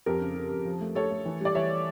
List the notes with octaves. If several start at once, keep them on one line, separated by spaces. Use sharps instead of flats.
F2 G4 A#4
C#3
C#3
F2
F3
A3
A3 A4 C#5
A3
E3
G3 D5
E3 C#5 E5